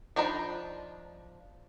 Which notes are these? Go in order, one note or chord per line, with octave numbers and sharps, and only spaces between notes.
F3 D4 D#4 A#5 B5